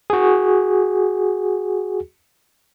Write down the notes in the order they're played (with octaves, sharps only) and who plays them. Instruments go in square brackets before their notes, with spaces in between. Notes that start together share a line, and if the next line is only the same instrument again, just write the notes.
[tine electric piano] F#4 G#4